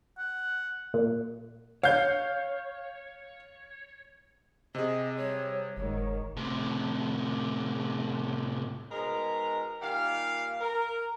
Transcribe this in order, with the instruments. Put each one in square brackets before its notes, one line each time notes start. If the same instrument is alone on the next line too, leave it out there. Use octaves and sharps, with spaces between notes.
[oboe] F#5
[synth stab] A#2
[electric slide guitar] C#5 [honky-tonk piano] F5 G6
[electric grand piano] C3 G#4 [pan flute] D#5
[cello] G3 [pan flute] C#5
[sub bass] F#1 [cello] G#2 D#3 [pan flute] C#5
[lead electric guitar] A2 C3
[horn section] G#2 B2 G#3 A#4 A#5
A#2 D#3 G3 G4 F5
A#4